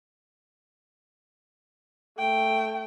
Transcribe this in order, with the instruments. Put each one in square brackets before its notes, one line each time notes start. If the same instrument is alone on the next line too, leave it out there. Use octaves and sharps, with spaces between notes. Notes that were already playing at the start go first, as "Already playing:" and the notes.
[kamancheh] A3 G5